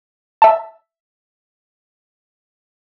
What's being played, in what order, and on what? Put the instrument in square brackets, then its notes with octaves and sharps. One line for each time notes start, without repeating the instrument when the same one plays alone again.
[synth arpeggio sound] E5 A5